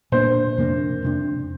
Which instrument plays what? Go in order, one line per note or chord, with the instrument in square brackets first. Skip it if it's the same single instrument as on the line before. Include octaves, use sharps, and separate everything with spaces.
[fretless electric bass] A#2 A#3 D4 [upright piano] C5
[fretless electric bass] F2 C3 A#3 D4
F2 C3 A#3 D4